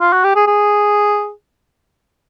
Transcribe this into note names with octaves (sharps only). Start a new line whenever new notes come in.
F4
F#4
G4
G#4
G#4